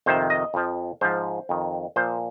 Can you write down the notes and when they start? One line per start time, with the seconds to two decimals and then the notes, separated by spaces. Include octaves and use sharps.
0.06 F2 C3 D#3 C5
0.30 D#5
0.54 F2 F3
1.01 G#2 F3 C5
1.49 F2 D#3
1.96 A#2 F3 C5